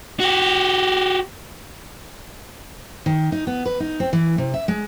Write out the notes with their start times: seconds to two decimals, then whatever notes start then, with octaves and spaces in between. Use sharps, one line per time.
0.20 F#4 G4
3.06 D#3
3.32 D#4
3.47 B3
3.66 B4
3.80 D#4
4.00 C4
4.13 E3
4.38 C3
4.54 E5
4.68 G#3